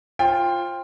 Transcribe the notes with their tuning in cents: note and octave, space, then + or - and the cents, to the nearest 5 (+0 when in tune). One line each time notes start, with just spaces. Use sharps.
F4 +0 C5 +30 G5 +20